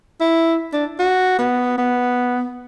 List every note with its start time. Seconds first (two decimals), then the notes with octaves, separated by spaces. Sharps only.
0.21 E4
0.73 D4
0.99 F#4
1.39 B3
1.78 B3